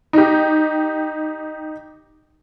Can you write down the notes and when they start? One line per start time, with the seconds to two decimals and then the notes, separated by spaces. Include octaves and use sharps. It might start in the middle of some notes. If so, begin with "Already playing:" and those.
0.13 D#4 G4